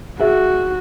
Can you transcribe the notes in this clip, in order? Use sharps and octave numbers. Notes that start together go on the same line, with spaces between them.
F#4 G#4 E5